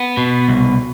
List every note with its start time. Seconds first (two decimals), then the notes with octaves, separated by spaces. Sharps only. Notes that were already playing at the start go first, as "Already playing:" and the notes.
Already playing: B3
0.17 B2
0.48 C2